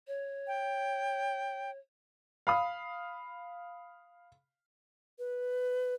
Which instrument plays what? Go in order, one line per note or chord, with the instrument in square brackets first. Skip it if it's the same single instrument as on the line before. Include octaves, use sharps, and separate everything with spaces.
[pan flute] C#5
[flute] G5
[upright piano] F5 B5 D#6
[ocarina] B4